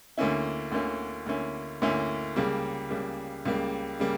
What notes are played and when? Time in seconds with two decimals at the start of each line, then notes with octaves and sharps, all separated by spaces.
0.18 D2 D3 A#3 C#4 E4
0.72 D2 D3 A#3 C#4 E4
1.26 D2 D3 A#3 C#4 E4
1.82 D2 D3 A#3 C#4 E4
2.36 C#2 C#3 G3 A#3
2.90 C#2 C#3 G3 A#3
3.46 C#2 C#3 G3 A#3
4.00 C#3 G3 A#3